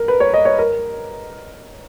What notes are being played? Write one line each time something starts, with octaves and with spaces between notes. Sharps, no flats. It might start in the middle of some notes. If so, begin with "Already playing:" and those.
Already playing: A#4
B4
C#5
D#5
C#5
A#4